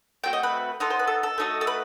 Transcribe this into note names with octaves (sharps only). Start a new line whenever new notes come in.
A3 C4 F#4 G5
D#5
B4
B3 D#4 A4 C5
C5
B4
A4
A4
A3 D#4 F#4 A4
A4
B4